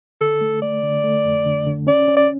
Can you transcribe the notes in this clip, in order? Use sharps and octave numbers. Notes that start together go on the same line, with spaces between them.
D3 A4
A3
A3 D5
D3
A3
F2
D3
D3
C#4 D5
C#4
D5